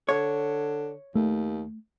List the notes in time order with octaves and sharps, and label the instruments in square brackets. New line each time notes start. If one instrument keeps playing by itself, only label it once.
[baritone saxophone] D3 [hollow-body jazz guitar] C#5
[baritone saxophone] D#2 [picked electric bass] A3